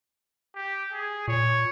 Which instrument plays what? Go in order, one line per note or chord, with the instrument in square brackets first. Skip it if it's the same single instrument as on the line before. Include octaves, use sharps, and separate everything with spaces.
[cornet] G4
G#4
[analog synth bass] A#2 [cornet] C#5